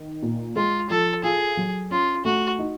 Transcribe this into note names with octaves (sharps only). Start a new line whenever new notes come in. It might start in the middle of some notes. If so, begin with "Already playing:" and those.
Already playing: D#3
A#2
G#3 F4
F3 A4
F4 G#4
F#3
C#4 F4
A3 F#4
D#4